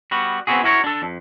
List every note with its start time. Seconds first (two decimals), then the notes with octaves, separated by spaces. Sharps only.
0.11 G3 B3 F#4
0.47 B3 C4 D4 E4 F#4 G#4
0.63 E4 F#4 A#4 C#5
0.84 D4 A4
1.02 F2